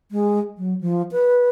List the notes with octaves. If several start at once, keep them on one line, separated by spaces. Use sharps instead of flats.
G#3
F#3
F3
B4